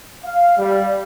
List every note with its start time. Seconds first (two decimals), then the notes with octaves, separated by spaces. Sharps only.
0.24 F5
0.58 G3